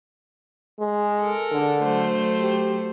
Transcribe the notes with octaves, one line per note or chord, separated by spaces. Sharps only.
G#3
A4 A#4
D3
F#3 A3 C5
G4